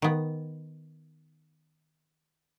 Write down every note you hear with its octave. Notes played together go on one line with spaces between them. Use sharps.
D#3 B3